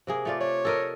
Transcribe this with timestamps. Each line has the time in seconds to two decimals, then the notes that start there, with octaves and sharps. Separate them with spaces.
0.07 C3 A#3 G#4
0.25 A3 F4 D5
0.40 C#5 D5
0.65 A4 A#4 D#5